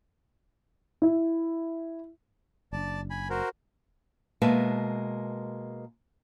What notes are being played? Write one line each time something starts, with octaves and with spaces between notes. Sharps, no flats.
E4
F#1 D4 D5 A5
G#5 B5
F#4 A#4 C5
B2 G#3 A#3 B4 E5 A5